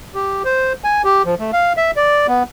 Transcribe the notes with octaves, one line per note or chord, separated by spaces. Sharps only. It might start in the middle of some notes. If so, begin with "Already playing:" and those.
G4
C5
G#5
G4
F3
A3
F5
E5
D5
B3